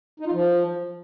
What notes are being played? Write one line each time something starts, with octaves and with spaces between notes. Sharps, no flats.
D#4
F4
F3